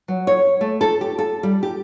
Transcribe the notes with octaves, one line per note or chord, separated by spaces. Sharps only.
F#3
C#5
A3
A4
G4
A4
G3
G4